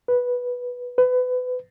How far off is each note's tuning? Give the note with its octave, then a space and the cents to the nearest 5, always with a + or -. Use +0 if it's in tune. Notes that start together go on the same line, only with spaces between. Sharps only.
B4 -5
B4 +30